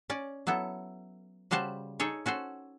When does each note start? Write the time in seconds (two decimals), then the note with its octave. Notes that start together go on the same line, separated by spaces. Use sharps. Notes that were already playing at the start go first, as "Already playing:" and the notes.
0.10 C#4 D5
0.47 F#3 B3 E4 A4
1.51 C#3 G3 F#4 C5 A5
2.00 D#4 G#4 A4 C#5
2.26 C#4 F#4 A4 C5